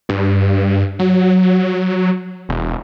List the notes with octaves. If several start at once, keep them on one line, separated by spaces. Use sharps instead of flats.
G2
F#3
E1